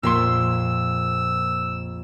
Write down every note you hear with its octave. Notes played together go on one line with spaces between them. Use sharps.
A#1 F2 A#2 A#3 C6 E6